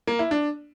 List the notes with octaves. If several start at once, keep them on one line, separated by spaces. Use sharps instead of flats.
A#3
E4
D4